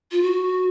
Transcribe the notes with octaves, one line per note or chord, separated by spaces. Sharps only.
F4
F#4